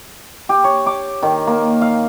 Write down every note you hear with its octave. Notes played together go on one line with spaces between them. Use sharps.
G4
C#5
D6
D#3
A#3
F5